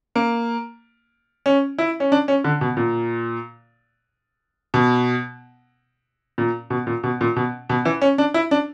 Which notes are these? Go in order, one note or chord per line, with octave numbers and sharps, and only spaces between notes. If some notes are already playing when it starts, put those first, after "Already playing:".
A#3
C#4
E4
C#4
D4
C#4
D3
B2
A#2
B2
A#2
B2
A#2
B2
A#2
B2
B2
E3
C#4
D4
E4
D4